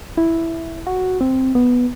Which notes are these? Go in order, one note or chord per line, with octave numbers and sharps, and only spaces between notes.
E4
F#4
C4
B3